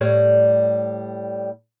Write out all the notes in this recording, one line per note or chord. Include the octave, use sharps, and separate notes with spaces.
A2 G3 C#5